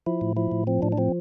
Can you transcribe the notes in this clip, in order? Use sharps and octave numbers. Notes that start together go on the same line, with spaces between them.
F3 E4
A2
F3 E4
A2
F3 C4
A2 D4
D4
F3 C4